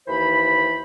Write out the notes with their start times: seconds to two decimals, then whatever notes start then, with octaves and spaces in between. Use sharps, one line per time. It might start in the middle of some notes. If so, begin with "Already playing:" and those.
0.08 D#2 E3 C5 B5